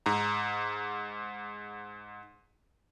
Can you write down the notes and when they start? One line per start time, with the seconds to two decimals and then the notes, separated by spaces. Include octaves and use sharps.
0.06 G#2 A#5